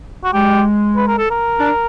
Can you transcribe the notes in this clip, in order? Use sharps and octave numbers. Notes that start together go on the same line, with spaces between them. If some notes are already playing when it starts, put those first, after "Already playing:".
F#4
G#3 G4
B4
A#4
A4
A#4
D4